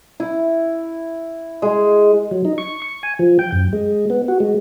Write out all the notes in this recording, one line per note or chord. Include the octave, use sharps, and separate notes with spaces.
E4
G#3
F#3
D#4
C#6
C#6
G#5
F3
G5
F#2
G#3
B3
F#4
G#3